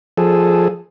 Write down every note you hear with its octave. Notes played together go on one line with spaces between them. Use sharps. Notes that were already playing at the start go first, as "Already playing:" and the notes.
F3 G#4 A4